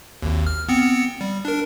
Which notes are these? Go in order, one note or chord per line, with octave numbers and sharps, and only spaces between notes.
G#1 D#2
F6
B3 C4 C#7
G3
D4 A#4